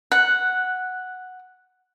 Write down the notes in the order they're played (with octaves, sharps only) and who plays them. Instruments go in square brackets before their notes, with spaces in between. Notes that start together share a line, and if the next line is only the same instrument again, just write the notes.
[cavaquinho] F#5 [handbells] F#6